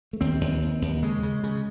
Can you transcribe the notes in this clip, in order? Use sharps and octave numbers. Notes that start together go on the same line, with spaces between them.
A3
D#2 C4
D#2
D#2
D#2
C#3 G#3
C#3
C#3